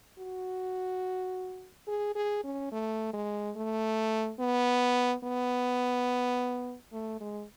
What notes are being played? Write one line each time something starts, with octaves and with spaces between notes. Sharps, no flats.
F#4
G#4
G#4
C#4
A3
G#3
A3
B3
B3
A3
G#3